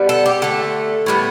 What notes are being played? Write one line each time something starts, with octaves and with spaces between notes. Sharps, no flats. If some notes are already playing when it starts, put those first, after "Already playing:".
Already playing: D3 G3 B3
A4
G4
D3 A3 A4
A2 G3 B3